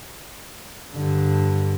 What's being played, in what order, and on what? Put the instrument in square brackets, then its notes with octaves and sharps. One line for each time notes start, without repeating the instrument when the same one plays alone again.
[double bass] G2 D3